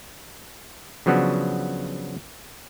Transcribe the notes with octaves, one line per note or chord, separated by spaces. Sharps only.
C#3 F3 F#3 B3 D4 F#4